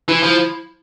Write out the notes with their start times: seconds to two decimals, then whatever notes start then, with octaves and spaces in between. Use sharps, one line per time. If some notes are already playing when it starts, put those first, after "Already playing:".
0.08 E3 E4
0.23 F3